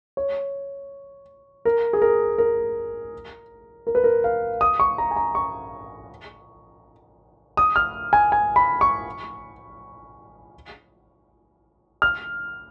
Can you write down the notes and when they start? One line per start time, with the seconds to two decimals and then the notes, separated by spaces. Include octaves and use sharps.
0.17 C#5
1.65 A#4
1.93 G#4
2.02 A#4
2.38 A#4
3.87 A#4
3.95 B4
4.04 A#4
4.24 F5
4.61 D#6
4.80 C#6
4.98 A#5
5.11 G#5
5.16 A#5
5.35 C#6
7.57 D#6
7.76 F6
8.13 G#5
8.32 G#5
8.56 B5
8.81 C#6
12.02 F6